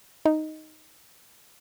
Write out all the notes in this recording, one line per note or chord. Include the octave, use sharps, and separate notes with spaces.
D#4